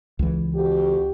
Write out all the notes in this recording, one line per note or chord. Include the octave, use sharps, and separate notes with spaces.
C#2 E3
F2 F#4 G4